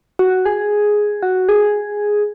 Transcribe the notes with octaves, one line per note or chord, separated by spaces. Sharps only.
F#4
G#4
F#4
G#4